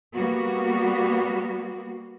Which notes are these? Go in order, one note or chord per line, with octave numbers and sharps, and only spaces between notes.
G3 A#3 B3 F#4